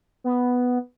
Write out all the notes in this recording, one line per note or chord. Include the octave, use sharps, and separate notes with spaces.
B3